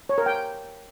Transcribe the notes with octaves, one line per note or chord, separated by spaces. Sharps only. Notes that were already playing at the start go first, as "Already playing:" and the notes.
C#5
A#4
G5